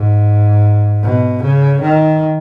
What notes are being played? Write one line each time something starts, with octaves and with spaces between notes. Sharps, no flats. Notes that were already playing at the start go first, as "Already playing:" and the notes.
Already playing: G#2
B2
C#3
D#3